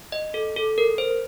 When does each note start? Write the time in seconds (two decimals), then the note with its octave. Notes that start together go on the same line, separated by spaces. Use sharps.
0.12 D#5
0.34 A4
0.56 A4
0.78 A#4
0.98 C5